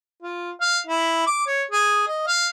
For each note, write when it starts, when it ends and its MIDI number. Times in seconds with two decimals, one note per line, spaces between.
0.23 0.51 65
0.61 0.79 77
0.87 1.25 64
1.27 1.45 86
1.47 1.63 73
1.71 2.04 68
2.08 2.24 75
2.27 2.48 77